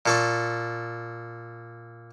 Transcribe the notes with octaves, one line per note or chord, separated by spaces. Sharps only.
A#2 A4 C#6